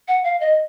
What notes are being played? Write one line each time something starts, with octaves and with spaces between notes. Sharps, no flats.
F#5
F5
D#5